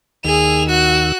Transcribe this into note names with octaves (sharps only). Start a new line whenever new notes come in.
D#2 D#3 G#4 E6 F7
F#4 F#6